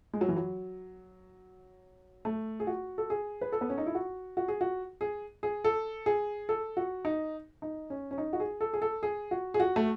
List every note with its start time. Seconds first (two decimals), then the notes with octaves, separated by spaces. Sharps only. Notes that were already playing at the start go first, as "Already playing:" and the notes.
0.13 G#3
0.21 F#3
0.29 E3
0.36 F#3
2.25 A3
2.60 G#4
2.67 F#4
2.98 A4
3.10 G#4
3.41 B4
3.52 A4
3.61 B3
3.70 C#4
3.78 D#4
3.86 E4
3.95 F#4
4.37 F#4
4.48 G#4
4.61 F#4
5.01 G#4
5.43 G#4
5.64 A4
6.06 G#4
6.49 A4
6.77 F#4
7.05 D#4
7.62 D#4
7.90 C#4
8.11 C#4
8.18 D#4
8.33 F#4
8.40 G#4
8.61 A4
8.73 G#4
8.82 A4
9.03 G#4
9.31 F#4
9.54 G#4
9.60 F#4
9.76 A3